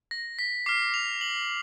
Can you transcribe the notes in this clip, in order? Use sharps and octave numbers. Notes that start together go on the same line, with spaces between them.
A#6
B6
D6 F6 C7
F7
F#7